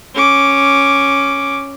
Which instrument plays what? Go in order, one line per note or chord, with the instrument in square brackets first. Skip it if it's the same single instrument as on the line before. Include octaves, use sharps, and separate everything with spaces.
[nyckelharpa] C#4 D6